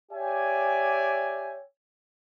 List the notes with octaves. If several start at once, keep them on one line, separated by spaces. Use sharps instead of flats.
G4 C#5 D5 E5 G5 G#5